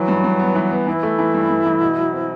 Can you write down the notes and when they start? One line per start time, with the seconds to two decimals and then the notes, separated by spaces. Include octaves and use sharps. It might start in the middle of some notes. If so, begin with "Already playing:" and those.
Already playing: E3 F#3
0.08 G2
0.24 G2
0.39 B3
0.55 E3
0.71 B3
0.87 E3 E4
1.03 A3
1.19 E3
1.34 G2
1.50 G2
1.65 E3
1.81 B2
1.98 F#3
2.13 C4